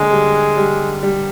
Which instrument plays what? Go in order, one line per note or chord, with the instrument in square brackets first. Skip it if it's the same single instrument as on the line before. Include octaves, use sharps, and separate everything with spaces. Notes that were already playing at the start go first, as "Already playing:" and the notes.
Already playing: [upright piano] D3 A#3 [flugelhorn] G#3
[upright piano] G3
G3
G3